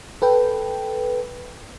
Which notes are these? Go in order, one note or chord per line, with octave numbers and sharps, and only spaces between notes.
A4 B4 G5